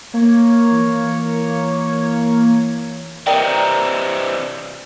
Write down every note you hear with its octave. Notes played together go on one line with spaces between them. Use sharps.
A#3 C#5
E3
C3 E3 A#4 D5 D#5 G5